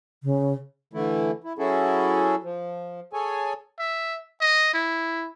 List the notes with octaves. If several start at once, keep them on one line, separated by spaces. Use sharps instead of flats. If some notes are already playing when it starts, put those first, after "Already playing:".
C#3
D3 E3 A3 E4
E4
F#3 C#4 E4 F#4 G#4 A4
F3
G#4 A4 C#5 G#5
E5
D#5
E4